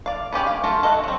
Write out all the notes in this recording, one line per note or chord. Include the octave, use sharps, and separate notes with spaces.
D5 F5
B3 C#4 G4 G#4
F5
A3 F4 F#4
A4 D#5 F5 F#5
F#3 C4